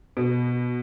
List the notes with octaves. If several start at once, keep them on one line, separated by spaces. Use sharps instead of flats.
B2